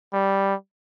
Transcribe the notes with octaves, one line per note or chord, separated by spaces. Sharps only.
G3